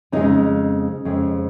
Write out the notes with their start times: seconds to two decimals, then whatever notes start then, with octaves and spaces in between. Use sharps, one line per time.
0.12 F2 C#3 G#3 D#4
1.05 F2 C#3 G#3